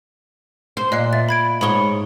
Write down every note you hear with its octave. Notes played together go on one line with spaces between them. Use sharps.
C5
A#2 D#5 F#6 C7
E5 A6
B5 G#6 D7
G#2 C#5 B5 D#6 G7